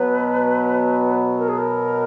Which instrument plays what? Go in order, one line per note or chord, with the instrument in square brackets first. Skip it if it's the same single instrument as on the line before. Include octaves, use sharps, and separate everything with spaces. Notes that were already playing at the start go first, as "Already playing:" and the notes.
Already playing: [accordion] B2 F#3 B3 [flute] B4
[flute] A#4
G#4
A#4